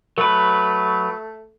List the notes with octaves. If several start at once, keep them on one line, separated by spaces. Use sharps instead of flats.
F#3 A3 B4